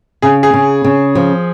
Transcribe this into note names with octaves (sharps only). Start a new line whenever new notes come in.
C#3 G#4
G#4
C#3
C#3
F3